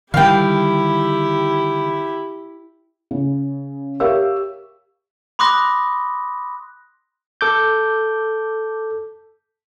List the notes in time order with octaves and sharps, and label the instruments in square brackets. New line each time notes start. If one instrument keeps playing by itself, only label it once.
[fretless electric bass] D3 D#3 G3 [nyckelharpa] E4 G4 [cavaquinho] F5 G5
[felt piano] C#3
G4 A#4 C#5 E5 F5 E6
[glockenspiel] B5 C6 D6 D#6 F#6 A#6
[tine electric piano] A4 D6 G6